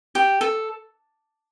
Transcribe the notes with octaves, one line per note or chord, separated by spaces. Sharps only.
G4
A4